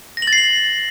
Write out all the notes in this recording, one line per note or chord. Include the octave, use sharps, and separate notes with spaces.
A#6
F#7
A6
C7
F#7